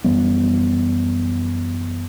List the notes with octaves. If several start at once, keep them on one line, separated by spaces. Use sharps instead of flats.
F#2 E3 G3 B3